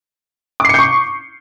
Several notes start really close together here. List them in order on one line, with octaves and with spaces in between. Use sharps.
D6 C7 C#7 G6 C#6